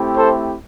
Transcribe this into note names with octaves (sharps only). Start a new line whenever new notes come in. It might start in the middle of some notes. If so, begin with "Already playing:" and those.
Already playing: A3 C4 E4 G4
A4 C5